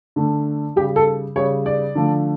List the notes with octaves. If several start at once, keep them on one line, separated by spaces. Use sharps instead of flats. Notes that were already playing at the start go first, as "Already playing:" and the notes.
D3 A3
C#3 G3 G4
A4
C#3 G3 C#5
D5
D3 F3 A3